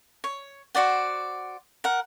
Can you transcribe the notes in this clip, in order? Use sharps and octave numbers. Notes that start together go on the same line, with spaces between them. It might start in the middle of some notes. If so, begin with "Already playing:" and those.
C#5
F#4 C5 D5 F#5
A#4 F#5